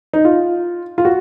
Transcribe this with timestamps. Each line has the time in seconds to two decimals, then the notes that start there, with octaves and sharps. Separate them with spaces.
0.13 D#4
0.25 F4
0.98 F4
1.05 F#4